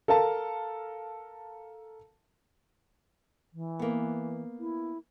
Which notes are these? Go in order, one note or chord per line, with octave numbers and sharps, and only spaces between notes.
A4 A#4 F5 A5
E3
A#3 B3
E4